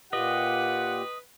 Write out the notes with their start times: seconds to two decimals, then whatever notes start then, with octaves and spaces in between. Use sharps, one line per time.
0.13 A#2 F4 G4 B4 D#5 F#5